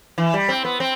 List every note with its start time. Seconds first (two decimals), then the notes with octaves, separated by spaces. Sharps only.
0.18 E3
0.34 G3
0.49 C4
0.65 B3
0.80 C4